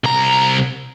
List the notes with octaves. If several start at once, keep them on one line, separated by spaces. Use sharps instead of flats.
C2 A#5